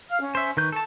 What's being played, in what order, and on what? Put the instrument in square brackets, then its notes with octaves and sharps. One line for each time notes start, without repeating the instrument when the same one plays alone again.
[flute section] F5 F6
C#4
[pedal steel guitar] C5 E5
[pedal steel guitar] D#3 B4 G6 [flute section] C#6
[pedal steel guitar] A4 A5